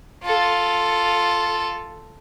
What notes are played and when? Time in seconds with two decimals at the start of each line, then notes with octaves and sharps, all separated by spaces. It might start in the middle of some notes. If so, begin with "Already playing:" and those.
0.25 F4 A4